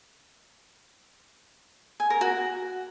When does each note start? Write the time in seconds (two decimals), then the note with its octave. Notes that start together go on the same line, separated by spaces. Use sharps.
2.00 G#5
2.10 A#4
2.21 F#4